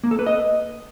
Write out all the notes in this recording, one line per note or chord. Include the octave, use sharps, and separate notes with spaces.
A#3
A4
B4
D#5